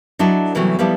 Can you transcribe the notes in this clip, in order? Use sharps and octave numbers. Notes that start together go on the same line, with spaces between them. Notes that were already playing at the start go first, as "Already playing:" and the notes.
F#3 D4 E4 A4 D#5
C3 E3 F#3 G3 A3 B3
F3 G3 B3 E4 A4 D5